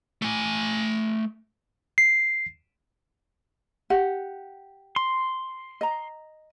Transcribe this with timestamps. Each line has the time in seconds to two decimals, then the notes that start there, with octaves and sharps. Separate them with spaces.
0.22 A3 G#5
1.98 C7
3.90 G4 F#5
4.96 C6
5.81 D#5 A#5